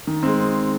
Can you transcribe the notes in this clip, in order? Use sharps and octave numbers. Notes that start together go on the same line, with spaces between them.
D#3
G#3 C4